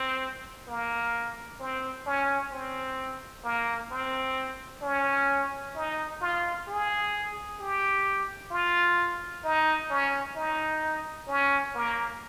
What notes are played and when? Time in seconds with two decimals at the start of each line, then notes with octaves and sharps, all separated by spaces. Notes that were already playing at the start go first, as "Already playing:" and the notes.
Already playing: C4
0.68 A#3
1.60 C4
2.06 C#4
2.52 C4
3.44 A#3
3.91 C4
4.82 C#4
5.75 D#4
6.21 F4
6.67 G#4
7.59 G4
8.51 F4
9.44 D#4
9.90 C#4
10.36 D#4
11.28 C#4
11.75 A#3